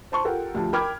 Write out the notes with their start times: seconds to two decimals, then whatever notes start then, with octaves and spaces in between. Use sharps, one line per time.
0.12 C5 A5 C6 C#6
0.24 F4 G4 A4 A#4 F#5 G5
0.54 D2 F3 G4 A5
0.73 A#4 G5 B5 D6 F6 G#6